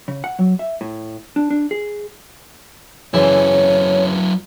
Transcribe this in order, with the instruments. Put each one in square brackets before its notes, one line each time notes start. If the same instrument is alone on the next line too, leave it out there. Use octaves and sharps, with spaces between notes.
[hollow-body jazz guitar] C#3
F#5
F#3
E5
A2
D4
D4
G#4
[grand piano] F#2 C#3 E3 [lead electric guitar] F#3 E4 [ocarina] C#5